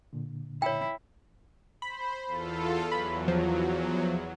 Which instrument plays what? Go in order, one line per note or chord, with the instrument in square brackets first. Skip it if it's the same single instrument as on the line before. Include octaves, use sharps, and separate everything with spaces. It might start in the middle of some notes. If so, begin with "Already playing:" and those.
[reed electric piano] A#2 D3
[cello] E4 [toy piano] C#5 G5
[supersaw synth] C5 [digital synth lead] B5
[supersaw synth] E2 F4 A4
[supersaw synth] E2 F#3 [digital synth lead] B5
[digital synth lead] F3